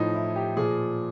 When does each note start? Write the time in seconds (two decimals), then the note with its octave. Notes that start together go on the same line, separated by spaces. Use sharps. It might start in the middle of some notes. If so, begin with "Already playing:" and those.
Already playing: A2 F3 D#4
0.14 E4
0.36 G4
0.56 A#2 F3 G#4